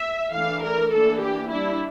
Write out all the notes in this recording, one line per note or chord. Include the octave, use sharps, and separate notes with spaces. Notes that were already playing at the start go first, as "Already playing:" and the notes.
Already playing: E5
E3 A3 D4 F5
A#4
E3 A#3 D4 A4
G4
G3 D4 E4